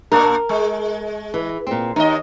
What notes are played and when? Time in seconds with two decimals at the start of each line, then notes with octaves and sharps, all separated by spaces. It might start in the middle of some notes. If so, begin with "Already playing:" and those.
0.12 A#2 A#3 D4 A#4
0.49 G#3
1.34 E3
1.67 A#2 C4
1.96 D#2 D#4 D#5